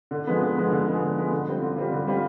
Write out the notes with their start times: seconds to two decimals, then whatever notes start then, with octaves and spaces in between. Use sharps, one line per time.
0.11 D3
0.27 F3 G#3 B3
0.42 D3
0.57 F3 G#3 B3
0.71 D3
0.86 F3 G#3 B3
1.02 D3
1.17 F3 G#3 B3
1.32 D3
1.47 G3 C4 F4
1.62 D3
1.77 G3 C4 F4
1.92 D3
2.07 G3 C4 F4